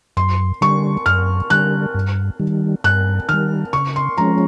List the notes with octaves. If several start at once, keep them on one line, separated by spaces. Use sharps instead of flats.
F#2 C6
D3 G3 C#6
F#2 F6
D3 G3 F#6
G2
D#3 G3
G2 F#6
D#3 G3 F6
C#3 C#6
C6
F3 G#3 C#4 A#5